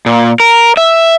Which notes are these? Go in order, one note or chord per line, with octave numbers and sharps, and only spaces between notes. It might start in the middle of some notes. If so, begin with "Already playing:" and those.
A#2
A#4
E5